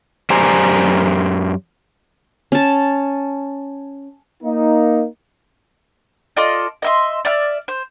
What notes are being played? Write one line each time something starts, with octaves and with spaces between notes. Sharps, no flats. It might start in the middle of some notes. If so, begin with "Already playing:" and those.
F#2 G4 C5 D5 G#5 A#5
C#4 A5
A#3 D#4
F4 A4 D5 D#5
D#5 E5 C6
D5 E5 F6
C5